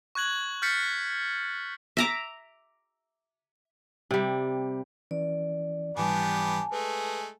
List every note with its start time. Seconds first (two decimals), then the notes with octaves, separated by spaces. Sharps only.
0.15 C#6 F#6 G#6 F#7
0.62 F6 G6 A6 B6 C#7
1.97 E5 A#5 D6
4.11 C3 G3
5.11 E3 C#4 E4 D5
5.97 G#2 E3 G3 B3 D4 G4 G#5 A5
6.72 G#3 A3 B4